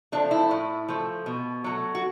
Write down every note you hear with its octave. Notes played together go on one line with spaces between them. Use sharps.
F3 A3 D4
E4
A2
F3 A3
B2
F#3 A3
F#4